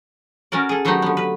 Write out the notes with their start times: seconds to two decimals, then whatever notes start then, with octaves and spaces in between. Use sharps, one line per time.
0.52 C#4 F#4 A#4 D5
0.69 G#4 A4
0.85 D#3 F#3 A3 B3 D#4 G4
1.02 D3 B3
1.17 B4